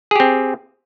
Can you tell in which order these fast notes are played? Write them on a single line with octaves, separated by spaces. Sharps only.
G#4 G4 C4